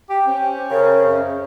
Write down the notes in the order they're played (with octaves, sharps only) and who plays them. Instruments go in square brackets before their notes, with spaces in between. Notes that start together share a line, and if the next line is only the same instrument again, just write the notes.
[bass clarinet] G4 [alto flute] G5
[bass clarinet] C#4 [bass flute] C5
[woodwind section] C#3 [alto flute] A#4
[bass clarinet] F#2